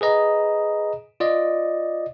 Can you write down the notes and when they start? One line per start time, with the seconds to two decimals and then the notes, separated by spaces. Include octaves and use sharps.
0.01 G#4 B4 D#5 A#5
1.20 F4 D5 D#5